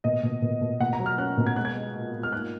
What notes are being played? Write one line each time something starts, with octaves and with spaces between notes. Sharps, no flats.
B2 D#5
B2
B2
B2
B2 F#5
A#5
F#3
F6
C#4 F#6
B2
G#6
G#3 F#6
G#6
G#3
A#2
A#2
F6
G#2 F#6